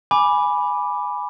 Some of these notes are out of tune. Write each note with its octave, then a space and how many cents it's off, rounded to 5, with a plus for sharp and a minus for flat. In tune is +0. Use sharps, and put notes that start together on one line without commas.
G#5 +0 B5 -5 D6 +0